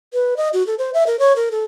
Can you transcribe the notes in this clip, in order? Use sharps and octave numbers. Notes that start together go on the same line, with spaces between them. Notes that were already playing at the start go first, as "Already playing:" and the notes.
B4
D#5
F#4
A4
C5
E5
A#4
C#5
A#4
A4